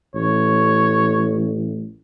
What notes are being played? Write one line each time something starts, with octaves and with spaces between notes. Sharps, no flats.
A1 C#5